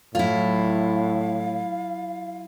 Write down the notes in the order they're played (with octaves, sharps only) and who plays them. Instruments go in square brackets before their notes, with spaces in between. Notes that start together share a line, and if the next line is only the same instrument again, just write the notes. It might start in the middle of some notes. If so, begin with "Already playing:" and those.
[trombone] A2 [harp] F#3 [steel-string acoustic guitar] E4 F4 [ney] F5